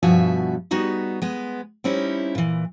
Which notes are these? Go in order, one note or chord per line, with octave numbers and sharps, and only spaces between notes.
G2 B2 F3 F#4 E5 G#5
G3 B3 D#4 F#4 G#4
G#3 B3
G3 C4 C#4 D#4 E4
A#2 E3